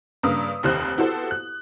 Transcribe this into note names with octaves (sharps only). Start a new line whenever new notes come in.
G2 C#3 A#3 B4 D#6 E6
F1 D#2 G4 C5 F#6
B3 E4 F#4 G4 A4 C5
F#6